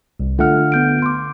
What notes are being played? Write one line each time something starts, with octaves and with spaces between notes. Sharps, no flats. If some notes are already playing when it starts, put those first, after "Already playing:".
C2
D3 A3 F4 F#5 F6
B3 G6 D7
C6 D6